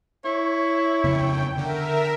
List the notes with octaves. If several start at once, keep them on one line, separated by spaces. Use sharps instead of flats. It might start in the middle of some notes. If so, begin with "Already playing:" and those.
E4 C#5
F2 C#3 B3 G5
D3 A#4 E5